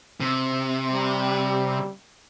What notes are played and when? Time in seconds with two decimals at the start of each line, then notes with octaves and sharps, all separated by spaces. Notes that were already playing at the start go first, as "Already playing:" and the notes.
0.20 C3
0.93 G3